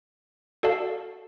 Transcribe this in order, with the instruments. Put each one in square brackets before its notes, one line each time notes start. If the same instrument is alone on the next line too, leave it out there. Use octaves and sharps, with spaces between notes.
[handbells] F#4 A4 D5 F5 A5